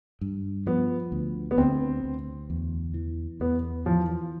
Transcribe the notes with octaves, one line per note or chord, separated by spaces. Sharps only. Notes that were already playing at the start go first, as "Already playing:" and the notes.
G2
F3 B3
D2
B3
D2 C4
D2
E2
E3
E2 B3
E3 F3